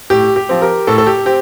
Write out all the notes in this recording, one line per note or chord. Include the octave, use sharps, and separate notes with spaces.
A2 G4
G4
F3 C4
G4 A#4
A2 A4
A4
G4
C4 G4